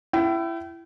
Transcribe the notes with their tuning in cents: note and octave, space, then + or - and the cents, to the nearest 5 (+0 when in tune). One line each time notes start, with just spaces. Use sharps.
E4 +20 G5 -35